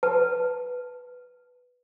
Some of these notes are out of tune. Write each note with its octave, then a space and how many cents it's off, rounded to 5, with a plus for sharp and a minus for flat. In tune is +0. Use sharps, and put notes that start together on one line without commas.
B4 +0 A5 +0